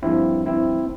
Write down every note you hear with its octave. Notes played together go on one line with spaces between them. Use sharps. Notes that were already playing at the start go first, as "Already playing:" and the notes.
G2 F3 C4 E4
C4 E4